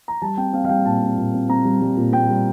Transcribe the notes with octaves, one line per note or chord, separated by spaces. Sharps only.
A#5
G3 A5
C4 G5
C4 F5
F5
G3 G5
A#2 A5
C4
A#2
C4
C4 A#5
G3
G3
A#2
C4 G5
G3